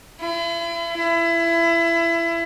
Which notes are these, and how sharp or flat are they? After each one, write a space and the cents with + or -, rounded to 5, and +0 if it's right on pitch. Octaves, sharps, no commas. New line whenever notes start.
E4 +40
E4 +25